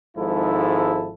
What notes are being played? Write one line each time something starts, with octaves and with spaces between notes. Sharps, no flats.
G#1 G#2 F3 E4 A4